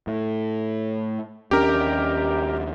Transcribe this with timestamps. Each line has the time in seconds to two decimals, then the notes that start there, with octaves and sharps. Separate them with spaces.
0.07 A2
1.51 D#2 C#4 D4 G4 A#4